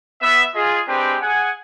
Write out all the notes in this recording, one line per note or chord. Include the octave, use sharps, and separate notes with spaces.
B3 E5
F4 G#4 D#5
G#3 C4 D4 G4 B4 G5
G#4 F#5 G#5